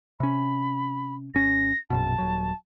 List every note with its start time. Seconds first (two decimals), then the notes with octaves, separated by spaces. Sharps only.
0.20 C3 C#4 B5
1.35 G#1 C#4 A#6
1.90 A#1 F#2 B2 A5
2.18 D#1 F#3